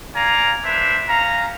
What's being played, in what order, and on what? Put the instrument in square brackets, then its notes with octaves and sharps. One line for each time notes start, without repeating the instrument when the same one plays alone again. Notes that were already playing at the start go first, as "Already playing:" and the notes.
[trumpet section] D5 F5 G#5 A#5
D4 B4 C5 E5
C#4 F5 A#5